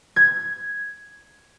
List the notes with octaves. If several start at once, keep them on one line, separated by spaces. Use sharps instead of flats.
G#6